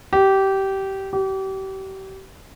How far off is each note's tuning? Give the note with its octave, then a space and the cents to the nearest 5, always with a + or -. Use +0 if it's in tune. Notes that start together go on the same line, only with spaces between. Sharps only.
G4 -20
G4 -35